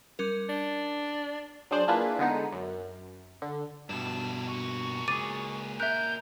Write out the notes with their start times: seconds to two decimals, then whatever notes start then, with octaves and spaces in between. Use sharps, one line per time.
0.19 G3 C#4 A#4
0.49 D4 A6 G7
1.71 F#3 D4 G#4 C5 D5
1.88 A#3 D4 E4 F4 G#4 B4
2.19 D3 G#3 B3 D#4
2.52 F#2
3.42 D3
3.89 G2 B2 D4 E4 E7
4.48 A#2 F#4 C#6
5.08 C#2 G#4 D6 A6 D#7
5.80 A#4 E5 F#6 G6